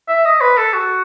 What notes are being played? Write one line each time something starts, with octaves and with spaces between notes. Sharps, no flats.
E5
D#5
B4
A4
F#4